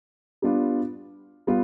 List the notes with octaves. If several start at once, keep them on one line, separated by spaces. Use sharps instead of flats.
G3 B3 D4 F4
G3 B3 F4